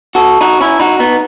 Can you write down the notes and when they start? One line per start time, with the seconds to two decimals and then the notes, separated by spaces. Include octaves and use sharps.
0.15 F#4 A4
0.41 D#4 F#4
0.61 C#4 E4
0.80 D#4 F#4
0.99 B3 D#4